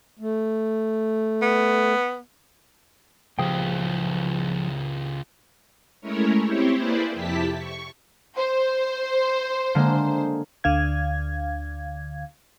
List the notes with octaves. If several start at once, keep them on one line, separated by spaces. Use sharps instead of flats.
A3
B3
C#2 F3 G4 G#4 G5
G#3 A3 C#4 E4 A#4 C#5
C4 E4 G4 C5 C#5
A#3 E4 G#4 B4 C5 D5
F2 C3 E4 G4 A5 B6
C#6
C5
D3 G#3 A#3
D2 D3 F5 G#6